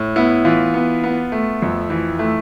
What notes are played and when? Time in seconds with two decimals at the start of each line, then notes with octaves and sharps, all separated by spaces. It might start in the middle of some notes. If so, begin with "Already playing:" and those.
Already playing: A2
0.16 B3 E4
0.45 E3 F4
0.74 B3
1.04 B3
1.32 A3
1.62 F2
1.90 E3
2.19 A3